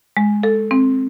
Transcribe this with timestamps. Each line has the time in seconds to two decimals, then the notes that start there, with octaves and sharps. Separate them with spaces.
0.17 G#3
0.43 A4
0.71 C4